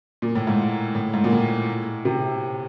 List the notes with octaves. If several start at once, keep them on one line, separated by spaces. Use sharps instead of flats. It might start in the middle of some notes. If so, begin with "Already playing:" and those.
A#2
A2
G#2
A2
G#2
A#2
A2
C3